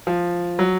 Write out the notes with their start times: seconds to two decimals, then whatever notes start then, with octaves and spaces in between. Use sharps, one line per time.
0.07 F3
0.59 F#3